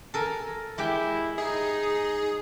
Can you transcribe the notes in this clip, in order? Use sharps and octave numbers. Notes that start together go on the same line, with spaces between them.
A4 A#4 G#5
G#3 E4 G4 G5
D#4 G#4